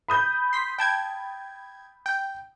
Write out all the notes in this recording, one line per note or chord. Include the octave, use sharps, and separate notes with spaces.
B5 D#6 G6
C6 B6
G5 A5 G#6
G5